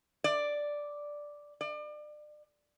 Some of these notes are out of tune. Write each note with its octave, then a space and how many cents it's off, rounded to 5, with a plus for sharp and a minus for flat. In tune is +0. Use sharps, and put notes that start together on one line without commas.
D5 +0
D5 +35